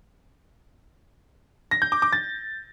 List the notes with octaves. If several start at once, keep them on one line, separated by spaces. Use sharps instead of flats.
A#6
G6
D6
D6
A6